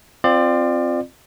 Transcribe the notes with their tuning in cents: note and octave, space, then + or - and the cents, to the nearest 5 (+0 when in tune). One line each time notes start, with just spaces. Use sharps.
C4 +0 F4 +0 D5 +30